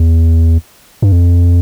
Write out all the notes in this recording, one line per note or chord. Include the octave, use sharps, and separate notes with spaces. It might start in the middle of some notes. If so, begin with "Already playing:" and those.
Already playing: E2
G2
F2